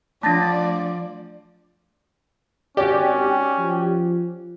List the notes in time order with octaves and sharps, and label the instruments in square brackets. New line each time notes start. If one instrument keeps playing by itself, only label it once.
[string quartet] F3 [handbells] A3 D4 [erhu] D5 [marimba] A5 A6 A#6
[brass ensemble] G#1 [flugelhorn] C#4 [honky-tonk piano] F#4 D5 [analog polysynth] G4
[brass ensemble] F3